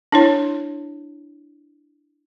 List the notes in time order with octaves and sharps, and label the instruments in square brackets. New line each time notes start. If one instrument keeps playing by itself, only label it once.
[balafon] D4 E4 C#5